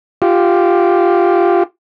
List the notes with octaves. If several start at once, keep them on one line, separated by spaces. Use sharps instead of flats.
F4 G4